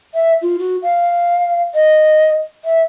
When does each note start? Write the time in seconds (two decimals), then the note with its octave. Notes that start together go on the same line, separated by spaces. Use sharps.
0.14 E5
0.41 F4
0.59 F#4
0.82 F5
1.74 D#5
2.64 E5